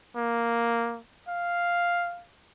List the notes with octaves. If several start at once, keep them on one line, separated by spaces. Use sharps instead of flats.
A#3
F5